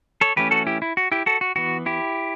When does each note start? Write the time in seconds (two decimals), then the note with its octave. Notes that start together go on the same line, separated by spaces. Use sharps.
0.21 A4 C#5
0.36 E3 A3 C#4 G4 B4
0.51 F#4 A4
0.67 E4 G4
0.82 E4
0.97 F#4
1.12 E4 G4
1.26 F#4 A4
1.41 F#4
1.56 E3 B3 F#4
1.86 E4 G4